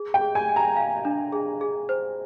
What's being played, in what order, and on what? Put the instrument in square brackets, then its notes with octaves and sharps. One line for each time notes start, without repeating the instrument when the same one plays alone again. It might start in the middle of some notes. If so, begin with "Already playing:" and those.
Already playing: [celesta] G#4
[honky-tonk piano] G5
[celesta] G#4
[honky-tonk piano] G#5
[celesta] G#5
[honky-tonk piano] A#5
[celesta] F5
D4
G#4
G#4
C5